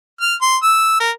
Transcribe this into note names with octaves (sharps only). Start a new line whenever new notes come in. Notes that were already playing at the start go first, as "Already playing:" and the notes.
F6
C6
E6
A#4